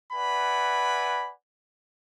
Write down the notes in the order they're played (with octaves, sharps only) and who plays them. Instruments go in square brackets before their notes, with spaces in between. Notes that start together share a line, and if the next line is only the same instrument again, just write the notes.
[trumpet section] B4 D5 E5 F#5 G#5 B5